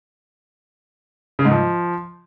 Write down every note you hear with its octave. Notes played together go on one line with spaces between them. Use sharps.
C#3
G#2
F3